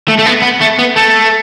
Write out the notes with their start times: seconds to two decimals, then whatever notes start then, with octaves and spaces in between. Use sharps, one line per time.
0.09 A3
0.19 A3
0.27 B3
0.43 B3
0.61 A3
0.79 B3
0.96 A3